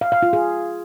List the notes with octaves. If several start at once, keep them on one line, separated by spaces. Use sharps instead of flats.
F5
F5
F4
G#4